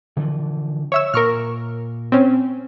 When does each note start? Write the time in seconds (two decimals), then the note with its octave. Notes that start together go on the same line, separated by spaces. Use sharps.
0.17 D3 E3 F3
0.92 C#5 E5 E6
1.14 A#2 A#4 C#6 F6
2.12 C4 C#4